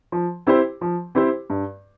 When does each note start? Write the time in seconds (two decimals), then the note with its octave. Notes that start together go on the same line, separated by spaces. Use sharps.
0.12 F3
0.47 C4 E4 G4 C5
0.81 F3
1.15 C4 E4 G4 C5
1.50 G2